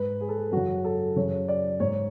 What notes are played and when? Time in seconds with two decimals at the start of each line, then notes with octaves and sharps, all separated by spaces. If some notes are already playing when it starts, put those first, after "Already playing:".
Already playing: G#2 B4
0.21 G#4
0.29 A4
0.37 G#4
0.52 F#2 C#3 F#4
0.84 A4
1.16 F#2 C#3 C#5
1.48 D5
1.80 G#2 C#5